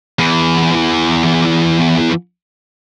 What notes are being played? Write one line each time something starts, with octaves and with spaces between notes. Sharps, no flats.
E2 E3